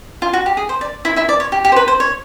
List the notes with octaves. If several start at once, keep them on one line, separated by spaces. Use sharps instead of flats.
F4
F#4
G4
G#4
C5
D5
E4 E5
E4 E5
D5
C#5
G4
G4
C5
B4
C5
C#5